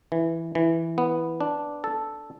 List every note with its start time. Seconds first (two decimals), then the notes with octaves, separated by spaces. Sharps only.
0.12 E3
0.55 E3
0.98 B3
1.41 D4
1.84 A4